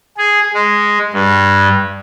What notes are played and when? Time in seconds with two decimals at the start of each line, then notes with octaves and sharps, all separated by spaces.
0.17 G#4
0.54 G#3
1.13 G2